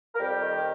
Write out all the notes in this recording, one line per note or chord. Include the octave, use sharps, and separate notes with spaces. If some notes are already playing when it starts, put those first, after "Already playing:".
A#4
F2 G3 G4
D#3